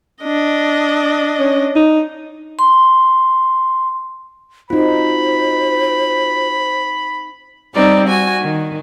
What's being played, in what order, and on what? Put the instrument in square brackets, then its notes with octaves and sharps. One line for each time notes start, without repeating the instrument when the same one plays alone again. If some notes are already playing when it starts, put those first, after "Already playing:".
[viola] D4 D#5
[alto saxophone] C#4
D#4
[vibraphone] C6
[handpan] C4 D#4 [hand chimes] F4 F#4 [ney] C5 [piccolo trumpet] B5
[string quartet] G3 C4 D#4 D5
F#4 G#5
D#3